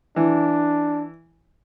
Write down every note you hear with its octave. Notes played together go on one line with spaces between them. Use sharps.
E3 D4